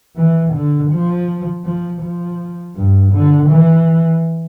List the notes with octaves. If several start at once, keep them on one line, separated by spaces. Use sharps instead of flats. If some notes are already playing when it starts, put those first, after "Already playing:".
E3
D3
F3
F3
F3
G2
D3
E3